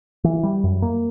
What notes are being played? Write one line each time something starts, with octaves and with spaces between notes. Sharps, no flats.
E3
G3
F#2
A#3